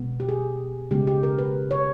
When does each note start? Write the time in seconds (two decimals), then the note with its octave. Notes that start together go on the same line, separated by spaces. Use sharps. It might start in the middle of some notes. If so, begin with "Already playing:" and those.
Already playing: B2 G#3 B3
0.20 G4
0.29 G#4
0.91 C#3 G#3 B3 G4
1.07 G4
1.23 A#4
1.38 B4
1.71 C#5